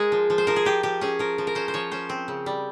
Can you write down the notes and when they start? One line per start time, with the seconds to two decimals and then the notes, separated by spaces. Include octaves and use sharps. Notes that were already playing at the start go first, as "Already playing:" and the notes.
Already playing: G#3 G#4 A#4
0.12 F3
0.30 F3
0.38 C5
0.47 F3 A#4
0.56 G#4
0.65 F3 G4
0.83 F3 G4
1.01 C#4 G#4
1.19 F3 A#4
1.38 F3
1.47 A#4
1.55 C#4 C5
1.68 C5
1.74 F3 C#5
1.91 C#4 C5
2.09 C4
2.28 C#3
2.46 G3